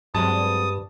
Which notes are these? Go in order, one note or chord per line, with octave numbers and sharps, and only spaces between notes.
G2 F#3 G#3 C4 A5 D#6